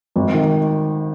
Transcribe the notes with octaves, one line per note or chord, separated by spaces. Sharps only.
G#1
D#3